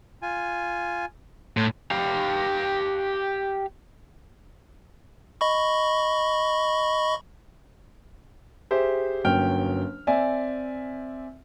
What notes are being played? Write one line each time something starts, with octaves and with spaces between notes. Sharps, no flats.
F4 G#5
A2 C6
G4 F5
D#5 B5 C#6
G4 G#4 C5 E5
G1 F#3 A#3 C#4 G5 F6
C4 D5 E5 G#5